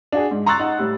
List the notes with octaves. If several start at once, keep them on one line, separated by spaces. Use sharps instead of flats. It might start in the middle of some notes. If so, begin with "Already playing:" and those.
D4 F#4 G#4
G#2
A#5 C6 C#6 E6 F#6 A6
D#4 F#5
A2 G3